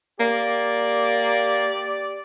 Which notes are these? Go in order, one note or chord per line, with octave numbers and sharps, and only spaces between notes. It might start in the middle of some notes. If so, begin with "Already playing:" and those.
A#3 G4 D5